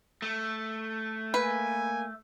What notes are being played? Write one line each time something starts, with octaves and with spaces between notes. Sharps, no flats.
A3
A#3 B4 G#5